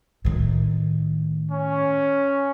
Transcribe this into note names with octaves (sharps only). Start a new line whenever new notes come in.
A2 D#3
C#4